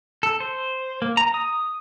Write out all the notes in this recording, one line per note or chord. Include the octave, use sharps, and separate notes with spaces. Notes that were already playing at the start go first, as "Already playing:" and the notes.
A4
C5
A#3
A#5
D#6